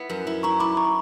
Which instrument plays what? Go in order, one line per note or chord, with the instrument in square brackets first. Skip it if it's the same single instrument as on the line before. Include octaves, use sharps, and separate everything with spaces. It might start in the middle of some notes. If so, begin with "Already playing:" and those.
Already playing: [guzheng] B3 E4
F#2
E4
[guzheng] E4 [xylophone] A#5 C#6
[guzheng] E4 [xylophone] B5 D6
[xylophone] A#5 C#6